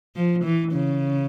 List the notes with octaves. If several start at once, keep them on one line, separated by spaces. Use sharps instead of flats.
F3
E3
C#3